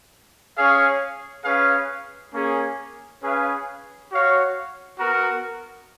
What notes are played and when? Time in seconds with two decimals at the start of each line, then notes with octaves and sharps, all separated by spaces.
0.56 C#4 G#4 C#5 F5
1.44 C#4 G#4 B4 F5
2.32 A#3 C#4 G#4
3.21 C#4 G#4 B4 F5
4.09 F#4 C#5 F5
4.97 B3 F#4 A#4